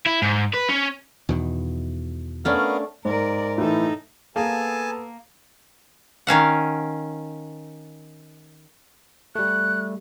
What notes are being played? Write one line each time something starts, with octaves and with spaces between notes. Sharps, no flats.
E4
G#2
B4
C#4
E2 B2 D#3
A3 B3 C#4 D4 A#4 F5
G#2 A#4 D5
A2 E3 D#4 A4
A#3 B3 G#4 A4 G#5 A5
D#3 C#4 F5 F#5
G3 A3 F#6